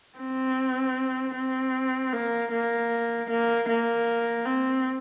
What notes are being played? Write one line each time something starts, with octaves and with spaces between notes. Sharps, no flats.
C4
C4
A#3
A#3
A#3
A#3
C4